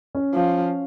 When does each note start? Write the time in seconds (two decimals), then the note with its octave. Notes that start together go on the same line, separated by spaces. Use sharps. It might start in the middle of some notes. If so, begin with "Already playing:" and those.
0.15 C#4
0.34 F3